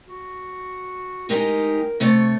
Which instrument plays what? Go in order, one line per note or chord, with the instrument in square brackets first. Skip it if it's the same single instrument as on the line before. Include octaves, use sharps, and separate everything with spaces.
[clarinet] F#4
[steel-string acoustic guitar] G#3 D#4 G4 [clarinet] A#4
[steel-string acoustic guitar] C3 A3 C#5 [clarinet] A4